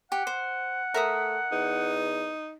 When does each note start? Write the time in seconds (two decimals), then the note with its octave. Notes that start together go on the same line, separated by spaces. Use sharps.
0.12 G4 F#5
0.27 C5
0.94 A3 A#4 E5 D#6
1.52 E2 D#4